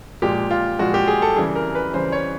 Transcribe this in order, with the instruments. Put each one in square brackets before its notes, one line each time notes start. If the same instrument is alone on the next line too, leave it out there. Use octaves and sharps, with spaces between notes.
[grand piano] A#2 F3 G#3 G4
F4
A#2 F3 G#3 F#4
G4
G#4
A4
C#3 E3 G3 G#4
A#4
B4
C#3 E3 G3 C5
C#5